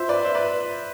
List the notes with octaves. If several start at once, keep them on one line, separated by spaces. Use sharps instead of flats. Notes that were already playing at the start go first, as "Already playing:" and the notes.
Already playing: F4 C5 E5
B4 D5
C5 E5
B4 D5